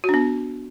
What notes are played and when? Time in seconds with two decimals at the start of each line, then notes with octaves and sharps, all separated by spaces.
0.04 F#4
0.09 D4
0.14 B3